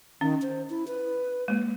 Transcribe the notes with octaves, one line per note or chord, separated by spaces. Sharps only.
D#3 C#4
C5
E4
B4
G#3 A#3